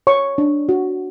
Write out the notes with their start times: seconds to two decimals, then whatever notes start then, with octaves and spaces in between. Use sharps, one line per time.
0.07 C#5 C#6
0.38 D4
0.69 F#4